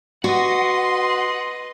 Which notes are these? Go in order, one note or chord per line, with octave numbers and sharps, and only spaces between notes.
F#4 B4 D#5 F#5 C6